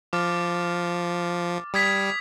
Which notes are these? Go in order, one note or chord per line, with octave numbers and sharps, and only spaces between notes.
F3 D6 F6 A6
G3 D#6 G#6 B6